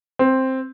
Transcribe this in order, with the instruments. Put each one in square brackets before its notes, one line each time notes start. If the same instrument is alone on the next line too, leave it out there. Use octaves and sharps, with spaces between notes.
[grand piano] C4